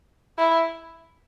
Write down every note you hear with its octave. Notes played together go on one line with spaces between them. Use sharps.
E4